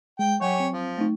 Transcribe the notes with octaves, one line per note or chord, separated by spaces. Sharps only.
G#3 G5
F#3 C#4 G4 C#5 F#5
C4
F3
A3 D#4